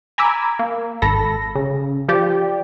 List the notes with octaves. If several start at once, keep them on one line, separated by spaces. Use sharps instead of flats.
G#5 A#5 B5 D6 E6
A#3
G#1 A4 B5 A#6
C#3
F3 G4 D5